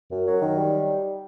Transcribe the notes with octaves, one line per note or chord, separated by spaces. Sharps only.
F#2
F#3
D#3
G3